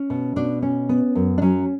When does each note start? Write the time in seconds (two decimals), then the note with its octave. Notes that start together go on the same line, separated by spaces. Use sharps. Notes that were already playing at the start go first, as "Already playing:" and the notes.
Already playing: C#4
0.10 B2
0.36 B2 D4
0.62 C#4
0.89 B3
1.15 F#2
1.38 D4
1.42 F#3 C#4